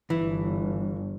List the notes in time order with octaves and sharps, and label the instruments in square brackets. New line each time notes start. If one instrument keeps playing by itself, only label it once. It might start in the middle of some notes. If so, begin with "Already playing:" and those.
[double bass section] G1 [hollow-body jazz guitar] E3